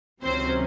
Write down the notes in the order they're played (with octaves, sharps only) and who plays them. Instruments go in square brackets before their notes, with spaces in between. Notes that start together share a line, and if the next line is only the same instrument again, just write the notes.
[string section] C#2 C3 D#3 F#3 C4 C#4 C5